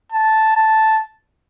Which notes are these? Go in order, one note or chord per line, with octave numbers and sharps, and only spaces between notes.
A5
A5